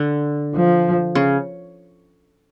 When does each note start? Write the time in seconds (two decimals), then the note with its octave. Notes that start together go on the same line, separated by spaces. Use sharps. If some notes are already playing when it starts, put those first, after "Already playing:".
Already playing: D3
0.54 F3
1.15 C#3